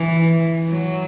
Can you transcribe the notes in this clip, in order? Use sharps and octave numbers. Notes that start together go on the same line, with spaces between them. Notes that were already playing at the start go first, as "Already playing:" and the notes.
Already playing: E3
F#3